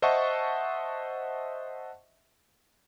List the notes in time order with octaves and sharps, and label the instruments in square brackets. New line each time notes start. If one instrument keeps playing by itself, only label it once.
[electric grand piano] C5 D#5 E5 F#5 A5 C#6